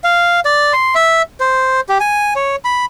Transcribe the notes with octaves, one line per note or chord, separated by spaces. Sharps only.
F5
D5
C6
E5
C5
G4
G#5
C#5
B5